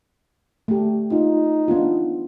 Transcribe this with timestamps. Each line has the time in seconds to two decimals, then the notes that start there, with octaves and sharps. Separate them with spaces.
0.68 A3 G4
1.12 D#4 F4
1.68 B3 D4 F4